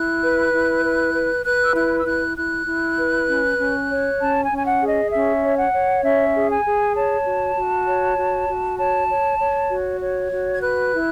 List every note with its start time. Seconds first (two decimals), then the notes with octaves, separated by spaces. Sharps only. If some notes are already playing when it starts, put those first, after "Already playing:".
Already playing: E4 F#6
0.23 B4
0.53 E4
0.84 B4
1.14 B4
1.45 B4 F#6
1.64 E6
1.75 E4 F#6
1.99 E6
2.06 E4 F#6
2.37 E4 F#6
2.67 E4
2.98 B4
3.28 C#4
3.58 C#4
3.89 C#5
4.20 C#4 A5
4.43 G#5
4.50 C#4
4.58 G#5
4.66 F#5
4.81 G#4
4.89 D#5
5.12 C#4 E5
5.42 C#5
5.57 F#5
5.73 C#5
6.03 C#4 E5
6.34 G#4
6.49 G#5
6.65 G#4
6.95 C#5 A5
7.26 F#4
7.56 F#4
7.86 C#5
8.17 F#4
8.48 F#4
8.78 C#5 A5
9.09 C#5
9.39 C#5
9.70 F#4
10.01 C#5
10.31 F#4
10.54 G#6
10.61 B4 F#6
10.93 E4